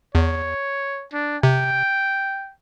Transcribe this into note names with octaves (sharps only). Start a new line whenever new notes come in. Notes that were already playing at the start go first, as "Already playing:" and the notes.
E2 C#5
D4
C3 G5